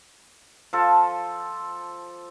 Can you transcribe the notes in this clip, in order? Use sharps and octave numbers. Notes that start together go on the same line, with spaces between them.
F3 A4